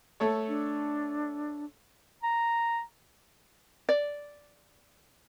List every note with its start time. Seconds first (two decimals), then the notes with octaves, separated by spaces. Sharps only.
0.20 A3 A4 C#5
0.48 D4
2.23 A#5
3.89 D5